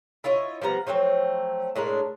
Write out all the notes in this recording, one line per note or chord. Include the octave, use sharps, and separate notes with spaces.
E4 F4 C#5 D#5
F3 G3 B3 A#5
F3 F#3 A3 C4
A2 G#3 D4 A#4